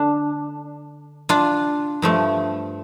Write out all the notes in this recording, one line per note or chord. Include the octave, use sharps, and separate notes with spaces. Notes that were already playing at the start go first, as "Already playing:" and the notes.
Already playing: D3 D4
D4 F4
G2 F3 A3